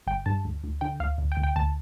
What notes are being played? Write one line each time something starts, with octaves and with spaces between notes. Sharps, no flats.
G1 G5
G2 A5
D2
D2
D3 G5
D2 F5
D2
G5
D2
G5
D2 A5